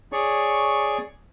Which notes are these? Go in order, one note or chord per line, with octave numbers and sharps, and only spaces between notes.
G#4 C#5 D5 C#6